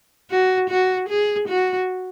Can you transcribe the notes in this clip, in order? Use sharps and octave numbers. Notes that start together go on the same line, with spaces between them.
F#4
F#4
G#4
F#4